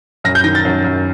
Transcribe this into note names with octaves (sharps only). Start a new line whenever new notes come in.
F#2 A#6
G6
D#3 A#6
A6
F#2
F#2